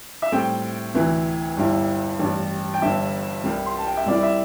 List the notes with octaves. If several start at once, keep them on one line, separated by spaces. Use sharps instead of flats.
E5
A2 G3 C4 G5
D2 C3 E3
G1 G2 G3 E4
A1 G2 G3
G5
G1 G2 D3 G3 E5
C2 C3 G3
C6
A5
G5
E5
C2 C3 G3 E4 D5
E5